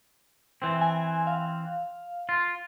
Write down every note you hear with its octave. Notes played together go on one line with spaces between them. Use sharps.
E3 C4
G#5
F5
F4